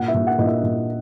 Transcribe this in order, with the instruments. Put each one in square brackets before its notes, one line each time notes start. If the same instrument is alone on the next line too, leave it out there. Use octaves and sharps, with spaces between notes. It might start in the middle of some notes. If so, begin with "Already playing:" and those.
Already playing: [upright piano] A#2 F#5
E5
A#2
F#5
A#2 D#5
E5
A#2